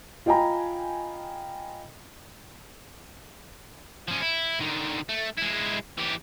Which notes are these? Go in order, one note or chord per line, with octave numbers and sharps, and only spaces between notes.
F4 D#5 G5 G#5 A#5 B5
F3 C#4
E4
D3 D#3
A3
G#3 E4
E3 G4